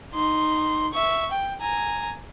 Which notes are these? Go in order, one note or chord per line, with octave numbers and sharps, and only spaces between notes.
D#4 C6
E5 C#6
G5
G#5 A#5